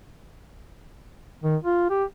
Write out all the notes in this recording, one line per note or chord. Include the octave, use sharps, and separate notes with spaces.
D#3
F4
G4